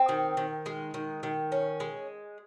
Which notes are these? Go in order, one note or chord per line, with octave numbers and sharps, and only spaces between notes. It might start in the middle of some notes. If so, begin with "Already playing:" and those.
Already playing: C4
D#3
D#3
G#3
D#3
D#3
C#4
G#3